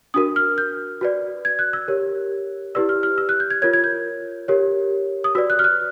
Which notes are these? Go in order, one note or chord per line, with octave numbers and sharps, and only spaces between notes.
D4 F#4 A#4 D#6
F6
G6
F#4 B4 D5
G#6
F#6
E6
G4 A#4 C#5
E4 G4 B4 D5 E6
F6
F6
E6
F#6
G6
G#6
F4 A#4 C#5 G#6
G#6
G6
G4 A#4 C#5
D#6
F#4 B4 D5 E6
F#6
F6
F#6